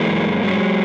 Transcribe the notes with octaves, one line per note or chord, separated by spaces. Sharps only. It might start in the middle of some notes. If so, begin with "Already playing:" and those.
Already playing: E3 G#3 A#3
F#2
F#2
G2 F#3 G#3